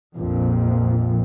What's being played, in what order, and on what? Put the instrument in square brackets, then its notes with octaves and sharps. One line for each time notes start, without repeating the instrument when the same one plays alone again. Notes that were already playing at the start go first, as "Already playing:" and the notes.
[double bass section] A#1 F2